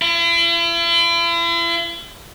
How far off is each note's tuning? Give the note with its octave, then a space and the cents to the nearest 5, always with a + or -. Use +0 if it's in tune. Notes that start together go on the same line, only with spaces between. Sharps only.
E4 +45